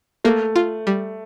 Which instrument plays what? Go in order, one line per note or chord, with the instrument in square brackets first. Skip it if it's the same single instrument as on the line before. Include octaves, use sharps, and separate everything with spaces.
[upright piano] A3 [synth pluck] A#3
[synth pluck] F4
G3